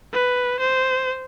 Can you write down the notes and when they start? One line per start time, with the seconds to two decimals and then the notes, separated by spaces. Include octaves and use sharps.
0.13 B4
0.60 C5